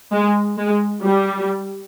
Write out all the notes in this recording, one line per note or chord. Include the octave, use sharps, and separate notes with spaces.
G#3
G#3
G3